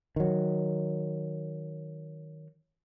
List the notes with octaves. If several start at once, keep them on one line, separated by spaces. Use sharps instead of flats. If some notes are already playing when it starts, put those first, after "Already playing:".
D#3 F#3